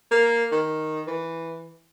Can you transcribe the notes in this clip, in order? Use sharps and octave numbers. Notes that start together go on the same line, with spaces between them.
A#3
D#3
E3